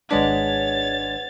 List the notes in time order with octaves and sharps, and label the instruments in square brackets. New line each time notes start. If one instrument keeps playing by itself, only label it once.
[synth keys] G#1 G#3 D4 [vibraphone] B4 F#5 [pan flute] C#5 [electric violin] A6